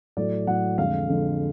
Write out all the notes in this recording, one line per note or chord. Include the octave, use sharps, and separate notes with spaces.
A2 F#3 A3 D5
A2 F#3 A3 F#5
F2 D3 G#3 F5
F2 D3 G#3